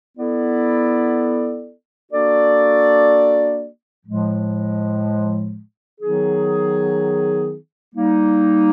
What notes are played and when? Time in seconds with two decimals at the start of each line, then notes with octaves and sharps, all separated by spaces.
0.17 B3 E4 A4 D5
2.11 A#3 D4 F#4 A4 D5
4.06 A2 F3 G#3
6.00 D#3 F#3 B3 D#4 G#4
7.94 G3 A#3 D#4